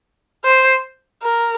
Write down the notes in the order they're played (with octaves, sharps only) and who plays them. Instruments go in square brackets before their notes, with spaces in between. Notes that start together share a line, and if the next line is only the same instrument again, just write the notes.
[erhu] C5
A#4